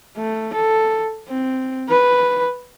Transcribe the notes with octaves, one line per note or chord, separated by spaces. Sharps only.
A3
A4
C4
B4